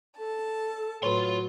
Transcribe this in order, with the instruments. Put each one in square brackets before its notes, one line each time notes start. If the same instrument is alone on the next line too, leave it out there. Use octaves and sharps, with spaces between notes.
[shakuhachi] A4 [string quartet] A5
[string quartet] A2 F#3 [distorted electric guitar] F4 C6 [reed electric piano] B4 C#5